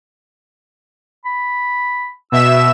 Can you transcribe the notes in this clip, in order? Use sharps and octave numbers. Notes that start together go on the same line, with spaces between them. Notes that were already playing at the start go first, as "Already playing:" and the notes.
B5
B2 E5 E6 E7